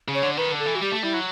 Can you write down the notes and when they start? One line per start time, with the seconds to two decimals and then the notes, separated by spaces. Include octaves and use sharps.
0.08 C#3
0.15 C#5
0.23 D3
0.37 D#3 B4
0.52 D3
0.59 A4
0.66 E3
0.75 F#4
0.81 G3 G4
0.91 A3
1.03 G3 E4
1.13 F#3